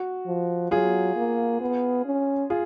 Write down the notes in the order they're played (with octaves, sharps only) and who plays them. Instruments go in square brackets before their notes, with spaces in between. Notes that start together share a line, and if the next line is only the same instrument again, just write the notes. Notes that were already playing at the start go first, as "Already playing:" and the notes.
Already playing: [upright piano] F#4
[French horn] F3
[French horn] F#3 [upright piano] F4 G#4
[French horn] A#3
B3
C#4
[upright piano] F4 G#4